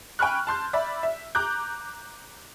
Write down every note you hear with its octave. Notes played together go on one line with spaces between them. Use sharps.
G5 G#5 B5 C#6 F6 F#6
A5 C6 G6
D5 E5 B5
E5
A#5 D6 F#6 G6